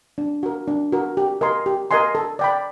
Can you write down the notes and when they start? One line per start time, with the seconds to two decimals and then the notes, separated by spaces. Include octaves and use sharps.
0.18 D4
0.43 F#4 A#4
0.68 D4
0.92 F#4 A#4
1.17 G4
1.41 A#4 D#5 G#5 C6
1.66 G4
1.91 A#4 D#5 G#5 C6
2.15 A4
2.39 D5 G5 B5